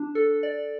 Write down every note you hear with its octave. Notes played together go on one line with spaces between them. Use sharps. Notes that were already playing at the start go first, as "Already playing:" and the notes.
Already playing: D4
A4
D5